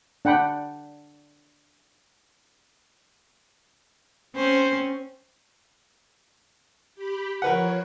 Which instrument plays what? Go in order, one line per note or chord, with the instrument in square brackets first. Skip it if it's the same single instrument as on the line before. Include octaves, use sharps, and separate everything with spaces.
[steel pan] D4 F#5 G5 B5
[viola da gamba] C4 C#4 [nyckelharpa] C5
[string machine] G4 B5
[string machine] F3 C#5 [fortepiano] A#4 B4 F#5